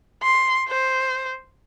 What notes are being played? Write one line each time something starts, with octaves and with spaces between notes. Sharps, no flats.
C6
C5